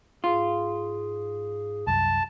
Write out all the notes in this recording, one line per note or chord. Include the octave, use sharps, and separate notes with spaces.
G#2 F4 G#4
C2 F#2 A5